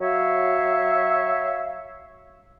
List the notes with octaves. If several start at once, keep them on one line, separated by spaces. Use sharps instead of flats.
F#3 F#4 C#5 E5 F5